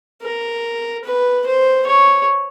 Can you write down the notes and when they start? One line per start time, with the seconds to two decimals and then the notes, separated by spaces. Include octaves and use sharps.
0.22 A#4
1.04 B4
1.46 C5
1.87 C#5